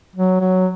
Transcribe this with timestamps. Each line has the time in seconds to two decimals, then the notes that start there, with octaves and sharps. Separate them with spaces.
0.16 F#3
0.40 F#3